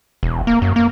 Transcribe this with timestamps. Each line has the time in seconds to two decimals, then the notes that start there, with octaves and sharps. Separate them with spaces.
0.23 E1
0.47 A#3
0.62 F#2
0.76 A#3